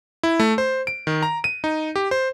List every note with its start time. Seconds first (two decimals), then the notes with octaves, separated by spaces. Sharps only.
0.23 E4
0.40 A3
0.58 C5
0.87 D7
1.07 D#3
1.23 A#5
1.44 D#7
1.64 D#4
1.96 G4
2.11 C5